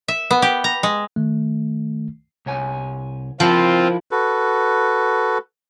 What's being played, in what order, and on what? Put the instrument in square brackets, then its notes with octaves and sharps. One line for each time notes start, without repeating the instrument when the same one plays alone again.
[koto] E5
B3
G4
A#5
G#3
[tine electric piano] D#3 A3
[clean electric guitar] C2 C#5 G#5
[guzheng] F3 [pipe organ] C4 F4 [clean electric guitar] E4 A#4 F5
[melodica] F#4 A4 B4